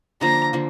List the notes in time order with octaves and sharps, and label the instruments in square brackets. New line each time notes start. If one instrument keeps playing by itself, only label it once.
[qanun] D3 F3 A#3 [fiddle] A#5
[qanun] D3 F3 A#3